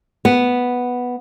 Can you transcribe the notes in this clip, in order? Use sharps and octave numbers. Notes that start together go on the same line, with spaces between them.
B3